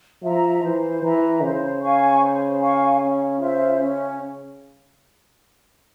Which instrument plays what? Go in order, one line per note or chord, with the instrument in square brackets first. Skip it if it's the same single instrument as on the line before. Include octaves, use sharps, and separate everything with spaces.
[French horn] F3 [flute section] E5 A#5
[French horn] E3 [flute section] C5
[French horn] E3 [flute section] E5 A#5
[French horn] C#3 [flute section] C5
[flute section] F5 G#5 C#6
C5
F5 G#5 C#6
C#4
F4 C5 E5
C#4